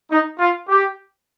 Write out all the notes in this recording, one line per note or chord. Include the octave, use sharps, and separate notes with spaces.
D#4
F4
G4